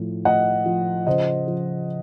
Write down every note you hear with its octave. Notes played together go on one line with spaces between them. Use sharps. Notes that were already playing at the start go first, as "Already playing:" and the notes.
Already playing: A2 F3
A2 D#5 F#5
F3
C#3 C5 D#5
F3